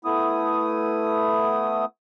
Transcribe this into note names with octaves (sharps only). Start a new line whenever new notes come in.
A3 B3 E4 D#6